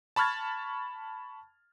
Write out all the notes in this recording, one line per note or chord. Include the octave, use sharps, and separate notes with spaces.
A5 B5 C#6 F6 G#6 A6